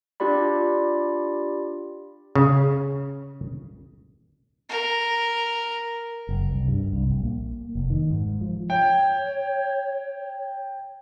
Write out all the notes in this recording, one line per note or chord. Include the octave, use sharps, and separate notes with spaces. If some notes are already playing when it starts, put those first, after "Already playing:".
D4 F4 G4 D5 B5
C#3
A#4
F#1
C2
G2
C2
A#1
A#3
F1
D#3
G#2
F3
C#5 G5